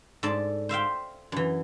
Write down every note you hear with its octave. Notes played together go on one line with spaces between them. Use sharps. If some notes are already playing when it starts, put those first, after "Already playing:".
G#2 A4 D5 A5
C5 E5 F5 G5
F#2 E3